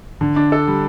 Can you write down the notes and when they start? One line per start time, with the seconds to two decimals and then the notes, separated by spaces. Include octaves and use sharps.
0.21 D3
0.36 D4
0.52 A4
0.68 G3